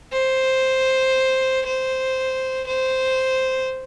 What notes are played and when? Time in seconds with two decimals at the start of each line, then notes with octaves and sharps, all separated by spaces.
0.13 C5
1.66 C5
2.67 C5